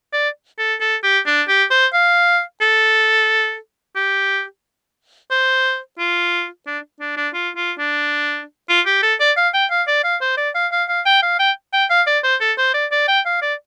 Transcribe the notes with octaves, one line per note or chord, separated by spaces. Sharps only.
D5
A4
A4
G4
D4
G4
C5
F5
A4
G4
C5
F4
D4
D4
D4
F4
F4
D4
F4
G4
A4
D5
F5
G5
F5
D5
F5
C5
D5
F5
F5
F5
G5
F5
G5
G5
F5
D5
C5
A4
C5
D5
D5
G5
F5
D5